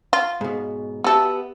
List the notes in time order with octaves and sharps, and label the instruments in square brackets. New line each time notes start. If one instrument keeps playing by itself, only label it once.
[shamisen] F4
[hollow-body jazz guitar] G#2 B2
[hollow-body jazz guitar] B3 G4 E5 [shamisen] F#4 A4